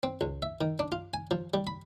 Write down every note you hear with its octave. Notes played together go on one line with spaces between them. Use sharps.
C4
C#2
E5
D#3
D4
F4
G#5
F3
G3
B5